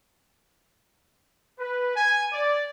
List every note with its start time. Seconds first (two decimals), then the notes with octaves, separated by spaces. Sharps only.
1.59 B4
1.95 G#5
2.33 D5